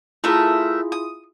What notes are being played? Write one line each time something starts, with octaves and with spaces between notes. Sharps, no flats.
A3 E4 F4 G#4 A#4 E5
D#6